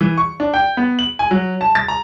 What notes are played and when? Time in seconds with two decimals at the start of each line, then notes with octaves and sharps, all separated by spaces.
0.01 E3
0.17 C#6
0.40 D4
0.54 G5
0.77 B3
0.99 F#7
1.19 G#5
1.31 F#3
1.61 A5
1.75 A6
1.88 A#5